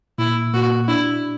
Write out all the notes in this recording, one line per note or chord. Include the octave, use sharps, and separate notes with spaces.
A#2 E4
A#2 F#4
D4 E4